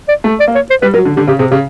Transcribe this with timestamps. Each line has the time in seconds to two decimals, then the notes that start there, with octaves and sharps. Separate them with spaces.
0.09 D5
0.24 A3
0.40 D5
0.47 A#3
0.55 C#5
0.70 C5
0.82 G3 B4
0.94 F#3 A#4
1.05 D3
1.17 D3 G4
1.27 C#3 G4
1.39 C3 G#4
1.51 C#3 G4